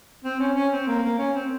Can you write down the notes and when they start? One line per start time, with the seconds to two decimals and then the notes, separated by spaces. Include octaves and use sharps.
0.24 C4
0.40 C#4
0.56 C#4
0.72 C4
0.87 A#3
1.03 A#3
1.19 C#4
1.35 C4